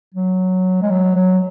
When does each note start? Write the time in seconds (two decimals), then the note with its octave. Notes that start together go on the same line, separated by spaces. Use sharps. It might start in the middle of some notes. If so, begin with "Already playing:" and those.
0.14 F#3
0.82 G#3
0.90 F#3
1.15 F#3